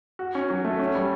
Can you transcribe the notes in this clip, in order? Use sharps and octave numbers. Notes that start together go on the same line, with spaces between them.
F#4
C#4
F#3
A3
C#4
G3